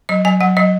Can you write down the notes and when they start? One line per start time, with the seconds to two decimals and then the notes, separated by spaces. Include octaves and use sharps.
0.09 F#3 D#5
0.25 F#3 G#5
0.41 F#3 F#5
0.57 F#3 D#5